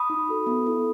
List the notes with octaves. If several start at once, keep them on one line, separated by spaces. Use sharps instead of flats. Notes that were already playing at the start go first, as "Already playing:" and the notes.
Already playing: B5 D#6
D#4
F#4 A4
B3
E4 A4